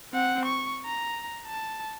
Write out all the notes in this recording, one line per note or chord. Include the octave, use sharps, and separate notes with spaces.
C4 F#5
C#6
A#5
A5